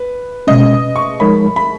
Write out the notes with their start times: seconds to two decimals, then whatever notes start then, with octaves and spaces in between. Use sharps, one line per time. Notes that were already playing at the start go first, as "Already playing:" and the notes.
Already playing: B4
0.47 B2 G#3 C#4 D#5
0.96 C#6
1.20 F3 G#3 D#4 A#4 C#5 B5
1.56 B5